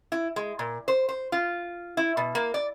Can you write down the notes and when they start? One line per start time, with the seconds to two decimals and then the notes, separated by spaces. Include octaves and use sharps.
0.12 E4
0.36 G#3
0.59 A#2
0.88 C5
1.09 C5
1.32 F4
1.97 E4
2.17 B2
2.35 A#3
2.54 D5